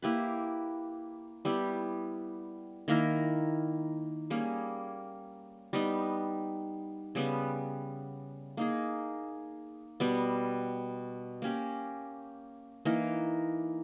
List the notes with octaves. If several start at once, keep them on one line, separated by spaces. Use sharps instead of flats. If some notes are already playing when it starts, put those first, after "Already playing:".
A#3 E4 G4 B4
G3 B3 E4 G4
D#3 A#3 E4 A#4
G3 A#3 C#4 G#4
G3 B3 D#4
C#3 G3 B3
A#3 D#4 G#4
B2 G3 B3
A#3 C#4 G4
E3 A#3 D#4 A#4